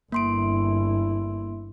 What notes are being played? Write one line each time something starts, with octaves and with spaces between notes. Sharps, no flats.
G1 A#3 E4 C6 D7